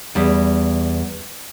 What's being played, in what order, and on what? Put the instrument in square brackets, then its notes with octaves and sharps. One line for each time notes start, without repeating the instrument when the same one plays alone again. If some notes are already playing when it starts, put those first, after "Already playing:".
[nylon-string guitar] E2 G3